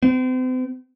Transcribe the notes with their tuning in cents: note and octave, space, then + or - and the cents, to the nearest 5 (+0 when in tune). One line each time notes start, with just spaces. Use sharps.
C4 -40